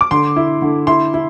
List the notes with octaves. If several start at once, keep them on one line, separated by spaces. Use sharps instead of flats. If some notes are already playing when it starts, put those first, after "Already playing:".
D6
D3 C6
E4
D3
E4 C6
E4